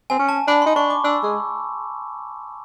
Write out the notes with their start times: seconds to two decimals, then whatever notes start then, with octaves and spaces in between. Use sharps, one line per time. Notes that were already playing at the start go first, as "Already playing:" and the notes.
0.10 C4 G#5
0.19 C#4
0.29 A5
0.47 D4 B5
0.62 D#4 C6
0.76 D4 C#6
0.90 D6
1.04 D4 E6
1.23 G#3